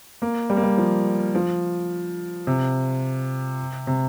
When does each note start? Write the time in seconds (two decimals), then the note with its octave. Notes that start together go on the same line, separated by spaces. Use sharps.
0.22 A#3
0.50 G3
0.57 A#3
0.63 G3
0.78 F3
1.35 F3
2.47 C3
3.87 C3